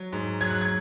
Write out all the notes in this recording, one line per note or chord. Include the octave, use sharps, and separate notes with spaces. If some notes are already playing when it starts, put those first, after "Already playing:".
Already playing: F#3
G#2
F#3 G#6
F#6
G#6